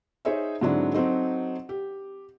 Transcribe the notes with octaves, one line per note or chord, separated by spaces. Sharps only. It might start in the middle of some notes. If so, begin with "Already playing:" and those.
D#4 G#4 C5 C#5 D#5 E5
G#2 D3 F#3 C4 D4 E4
F#3 C4 D#4 A4
G4